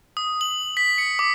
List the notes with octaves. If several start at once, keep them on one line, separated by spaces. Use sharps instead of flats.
D#6
F#7
B6
C#7
D6